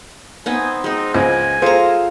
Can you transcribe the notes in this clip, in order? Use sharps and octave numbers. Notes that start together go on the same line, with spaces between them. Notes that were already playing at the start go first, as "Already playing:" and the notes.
B3 C4 D#4 G#5
G#3 C4 D#4
C#2 C5 D#5 G#5
F4 G#4 A4 C5 F5 A#5